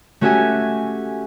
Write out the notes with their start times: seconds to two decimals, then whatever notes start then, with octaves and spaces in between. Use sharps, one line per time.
0.21 A3 C#4 F#4 G4 E5 G#5